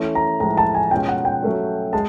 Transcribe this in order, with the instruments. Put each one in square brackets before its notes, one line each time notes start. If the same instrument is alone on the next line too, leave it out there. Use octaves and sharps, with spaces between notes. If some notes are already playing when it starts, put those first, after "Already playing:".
Already playing: [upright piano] E3 A3 C#4
[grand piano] A#5
[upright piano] A2 F3 G#3 [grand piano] A#5
[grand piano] A5
G#5
[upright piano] B2 G#3 C#4 F4 [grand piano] G5
[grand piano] F#5
G5
[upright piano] F#3 A3 C#4
[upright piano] G#3 [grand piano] A5